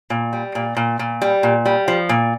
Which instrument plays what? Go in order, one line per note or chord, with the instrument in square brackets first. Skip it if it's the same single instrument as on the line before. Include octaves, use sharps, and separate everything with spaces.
[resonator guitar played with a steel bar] A#2
G3
A#2
A#2
A#2
G3
A#2
G3
F3
A#2